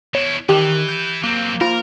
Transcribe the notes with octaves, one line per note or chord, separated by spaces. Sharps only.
B2 E4 C#5
D#3 E3 G4
G6
F#3 A#3 C4
F4 A#4